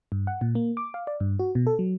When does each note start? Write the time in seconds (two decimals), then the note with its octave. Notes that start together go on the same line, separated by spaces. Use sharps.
0.12 G2
0.27 F#5
0.41 A#2
0.55 A#3
0.77 D6
0.94 F5
1.07 D5
1.20 G2
1.39 F#4
1.55 B2
1.67 A4
1.79 F#3